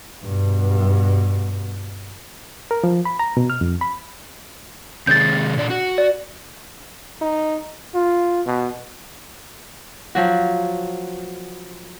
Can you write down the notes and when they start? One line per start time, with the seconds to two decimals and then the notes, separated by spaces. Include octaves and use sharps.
0.25 G2 B2
2.71 A#4
2.84 F3
3.05 B5
3.19 A#5
3.37 B2
3.50 F6
3.61 F2
3.81 B5
5.07 C3 D#3 G#3 G6 A6
5.57 A#2 D3 D5
5.70 F#4
5.98 D5
7.22 D#4
7.94 F4
8.46 B2
10.15 F3 F#3 F#4